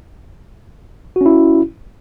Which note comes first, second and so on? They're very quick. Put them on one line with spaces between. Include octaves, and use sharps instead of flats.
F#4 C#4 E4